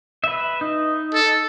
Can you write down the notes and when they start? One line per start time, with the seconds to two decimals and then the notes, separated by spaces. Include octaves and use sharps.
0.24 B4 E5
0.61 D#4
1.13 A4